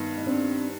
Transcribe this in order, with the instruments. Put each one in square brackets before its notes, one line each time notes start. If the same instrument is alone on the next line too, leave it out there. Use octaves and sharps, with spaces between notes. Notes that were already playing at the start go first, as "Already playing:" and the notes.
Already playing: [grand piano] G2 D#3 B3
[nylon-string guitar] D#4
C4 D4